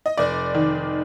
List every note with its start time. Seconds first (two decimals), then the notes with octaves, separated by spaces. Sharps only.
0.06 D#5
0.17 F1 D5
0.54 D#3